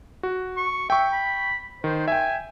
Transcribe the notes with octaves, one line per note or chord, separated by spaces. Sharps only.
F#4
C#6
E5 G5 C#6
B5
D#3 C5
E5 G5 G#5